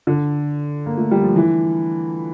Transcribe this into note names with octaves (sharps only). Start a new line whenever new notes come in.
D3
A#3
A3
G3
F3
E3